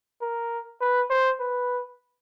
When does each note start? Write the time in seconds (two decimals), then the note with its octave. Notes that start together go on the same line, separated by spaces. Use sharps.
0.22 A#4
0.81 B4
1.10 C5
1.40 B4